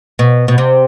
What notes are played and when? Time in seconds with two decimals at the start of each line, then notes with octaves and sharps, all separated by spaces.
0.19 B2
0.48 B2
0.58 C3